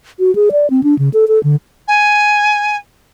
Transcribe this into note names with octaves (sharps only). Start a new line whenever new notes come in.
F#4
G#4
D5
C4
D4
C#3
A4
A4
D3
G#5